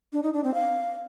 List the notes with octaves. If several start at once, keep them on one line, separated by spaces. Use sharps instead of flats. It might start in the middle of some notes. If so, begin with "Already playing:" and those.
D4
D#4
D4
C4
F5